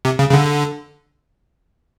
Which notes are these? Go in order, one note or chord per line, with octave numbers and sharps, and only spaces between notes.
C3
C#3
C#3
D3